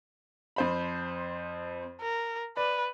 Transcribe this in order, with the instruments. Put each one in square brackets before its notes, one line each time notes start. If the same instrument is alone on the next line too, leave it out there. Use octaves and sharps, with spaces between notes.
[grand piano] F2 C5 B5
[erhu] A#4
[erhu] B4 [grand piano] D5